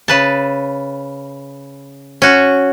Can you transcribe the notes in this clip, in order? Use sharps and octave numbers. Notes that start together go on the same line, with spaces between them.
C#3 B4 A5
C#4 F#4